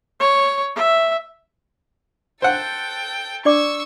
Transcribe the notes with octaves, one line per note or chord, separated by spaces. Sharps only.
C#5
E5
A4 C5 F#5 G5
D4 D5 C#6 D6 E6